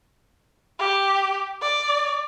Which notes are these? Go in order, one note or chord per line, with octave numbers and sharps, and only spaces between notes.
G4
D5